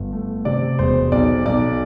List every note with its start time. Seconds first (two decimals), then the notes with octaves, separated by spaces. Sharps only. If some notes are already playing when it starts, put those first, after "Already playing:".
Already playing: G1
0.12 A3
0.45 C3 D5
0.79 E1 C5
1.12 B1 D5
1.46 B1 D5